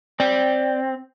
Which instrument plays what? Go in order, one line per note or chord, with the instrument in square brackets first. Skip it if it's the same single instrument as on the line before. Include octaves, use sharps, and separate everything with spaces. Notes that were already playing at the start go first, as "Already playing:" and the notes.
[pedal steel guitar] C4 [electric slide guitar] D5 G5